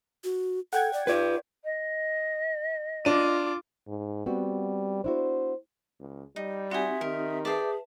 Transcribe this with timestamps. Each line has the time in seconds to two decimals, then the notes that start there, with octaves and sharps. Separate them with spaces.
0.24 F#4
0.73 A4 F#5 G5 G#6
0.93 D5
1.07 F4 B4 D5
1.64 D#5
3.05 D4 F4 D6 D#7
3.88 G#2
4.26 G3 B3 C4 F#4
5.04 D4 E4 F#4 C5
6.00 C#2
6.36 G3 D#4
6.71 C4 D#4 F#4 G4 E5 G#5
7.01 D#3 A#4
7.45 G#4 B4 D5 E5 G5 A5